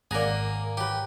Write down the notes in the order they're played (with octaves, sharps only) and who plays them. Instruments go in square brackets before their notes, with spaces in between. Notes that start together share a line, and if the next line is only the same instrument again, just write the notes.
[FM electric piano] G#1 A#5 [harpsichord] A#3 G#4 [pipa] D5 F#5
[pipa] F#3 B4 [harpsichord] G4